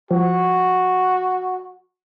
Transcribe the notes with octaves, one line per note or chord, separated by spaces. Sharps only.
F3 F#4